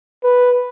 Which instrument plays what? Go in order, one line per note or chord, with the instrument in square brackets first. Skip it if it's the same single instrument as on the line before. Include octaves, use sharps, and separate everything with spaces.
[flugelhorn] B4